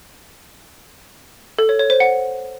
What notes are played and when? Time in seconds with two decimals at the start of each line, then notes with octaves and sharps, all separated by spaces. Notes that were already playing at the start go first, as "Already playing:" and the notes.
1.59 A4
1.69 C#5
1.79 C#5
1.90 C5
2.00 F#5